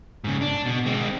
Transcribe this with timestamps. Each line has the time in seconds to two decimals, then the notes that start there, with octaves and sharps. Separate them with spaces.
0.24 G#2 C#3
0.41 D4
0.66 B2
0.86 G#3 C4